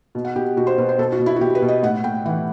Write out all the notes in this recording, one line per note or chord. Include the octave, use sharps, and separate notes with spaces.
B2
F#5
B2 G4
B2 F#4
C5
B2 B4
C5
B2 A4
F#4
B2
E4
F#4
B2 G4
B4
B2
D#5
A2 F#5
A2 G5
E3 F#5